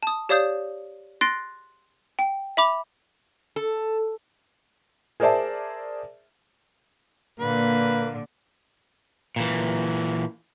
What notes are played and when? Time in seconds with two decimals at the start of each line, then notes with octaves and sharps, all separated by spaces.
0.03 A5 D#6
0.29 G4 C#5 D5 F5 D#6 G6
1.21 C6 F#6 A6 A#6 C7 D7
2.19 G5
2.57 E5 B5 D6 F7
3.56 A4
5.20 G#4 A#4 C5 D5 E5 A5
7.40 A#2 D3 A#3 B4
9.36 A#2 E3